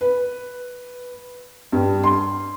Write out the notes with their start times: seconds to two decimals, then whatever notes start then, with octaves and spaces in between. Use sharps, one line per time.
0.01 B4
1.72 G2
2.04 C6